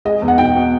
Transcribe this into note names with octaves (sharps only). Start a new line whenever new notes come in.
G#3 D#5
E2
F#5
B2 G5
B2